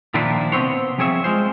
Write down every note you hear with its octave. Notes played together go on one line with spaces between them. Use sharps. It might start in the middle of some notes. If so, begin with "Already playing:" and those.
A#2 D#3 F3 D4 E4 F4
C3 B3 C4 C5 C#5
F3 C4 G#4 C#5 E5
G#3 F4 C5